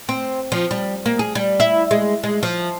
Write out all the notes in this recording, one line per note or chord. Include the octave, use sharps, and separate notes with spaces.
C4
F3
G3
A#3
G#4
G3
E4
G#3
G#3
F3